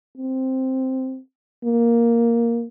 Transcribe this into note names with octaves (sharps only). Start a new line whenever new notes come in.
C4
A#3